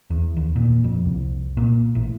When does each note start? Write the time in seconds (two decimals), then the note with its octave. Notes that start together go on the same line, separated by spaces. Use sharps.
0.10 E2
0.37 D#2
0.56 A#2
0.84 F2
1.05 C2
1.57 A#2
1.95 A1